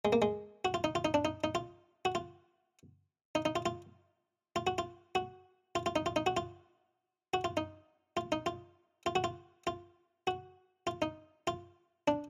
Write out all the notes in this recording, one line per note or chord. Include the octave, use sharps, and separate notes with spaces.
G#3
A#3
G#3
F#4
F4
D#4
F4
D#4
D4
D#4
D#4
F4
F#4
F4
D#4
D#4
F4
F4
F4
F#4
F4
F#4
F4
F4
D#4
F4
D#4
F#4
F4
F#4
F4
D#4
F4
D#4
F4
F4
F#4
F4
F4
F#4
F4
D#4
F4
D4